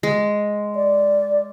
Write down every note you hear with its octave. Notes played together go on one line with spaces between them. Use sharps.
G#3
D5